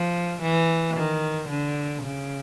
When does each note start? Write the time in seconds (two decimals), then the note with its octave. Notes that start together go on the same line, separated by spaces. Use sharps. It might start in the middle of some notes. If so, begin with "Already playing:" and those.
Already playing: F3
0.42 E3
0.96 D#3
1.49 D3
2.03 C#3